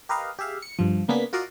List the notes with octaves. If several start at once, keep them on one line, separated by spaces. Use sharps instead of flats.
G4 A#4 B4 D#5 F5
G4 G#4 E5 F5
C#7
G2 F3
C#3 A#3 B3 D4 G#4 B6
F4 F#4 A#4 D5 D#5 F5